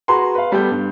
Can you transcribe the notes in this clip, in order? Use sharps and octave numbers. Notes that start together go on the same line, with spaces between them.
F#4 G#4 B4 A#5 C6
B4 F5
G3 B3 G4 A4 G6
G2